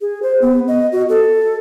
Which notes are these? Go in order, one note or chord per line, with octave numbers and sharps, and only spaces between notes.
G#4
C5
B3
D#5
F#4
A4